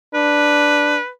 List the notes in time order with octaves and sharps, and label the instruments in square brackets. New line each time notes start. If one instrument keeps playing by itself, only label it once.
[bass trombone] D4 [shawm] B4